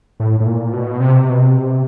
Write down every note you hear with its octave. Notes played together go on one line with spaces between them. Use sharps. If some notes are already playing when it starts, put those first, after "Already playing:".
A2
A2
A#2
B2
C3
B2
C3